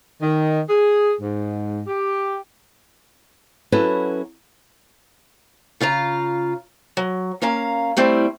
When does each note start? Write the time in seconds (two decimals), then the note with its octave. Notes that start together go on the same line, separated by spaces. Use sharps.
0.22 D#3
0.69 G#4
1.20 G#2
1.87 G4
3.72 F#3 C#4 E4 F#4 A4 B4
5.80 C#3 F4 F5 A#5
6.97 F#3
7.42 A#3 C#4 F5 A#5
7.97 G3 A3 C4 E4